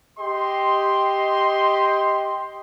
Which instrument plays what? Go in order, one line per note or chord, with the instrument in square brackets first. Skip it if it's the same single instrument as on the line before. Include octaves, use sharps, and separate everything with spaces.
[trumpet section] G4 D#5 C6